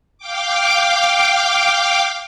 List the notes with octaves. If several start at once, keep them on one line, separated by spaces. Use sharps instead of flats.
F5 G5 D6